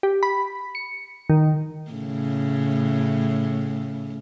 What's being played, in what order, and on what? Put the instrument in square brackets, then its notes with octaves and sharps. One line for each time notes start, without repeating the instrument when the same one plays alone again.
[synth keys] G4
B5
C#7
D#3
[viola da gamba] A2 C#3